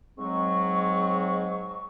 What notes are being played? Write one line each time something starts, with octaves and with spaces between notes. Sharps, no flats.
G#2 F#3 G#3 C4 C#6